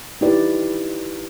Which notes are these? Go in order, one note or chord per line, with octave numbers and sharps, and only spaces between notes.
D#4 E4 G4 B4 D5